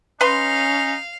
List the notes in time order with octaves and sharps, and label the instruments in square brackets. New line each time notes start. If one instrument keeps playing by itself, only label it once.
[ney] C#4 [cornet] D#4 [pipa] B4 C6 [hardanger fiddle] F5